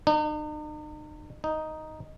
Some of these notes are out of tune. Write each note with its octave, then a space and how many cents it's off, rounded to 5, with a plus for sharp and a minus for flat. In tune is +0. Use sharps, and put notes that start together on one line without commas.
D#4 -45
D#4 +0